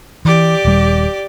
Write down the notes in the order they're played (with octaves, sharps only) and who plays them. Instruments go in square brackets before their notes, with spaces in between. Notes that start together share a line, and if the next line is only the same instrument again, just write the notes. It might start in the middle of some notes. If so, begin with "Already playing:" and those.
[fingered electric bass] E3 [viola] G4 D5
[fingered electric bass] D#1 G3